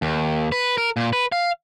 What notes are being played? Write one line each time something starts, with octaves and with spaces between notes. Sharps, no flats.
D#2
B4
A#4
A#2
B4
F5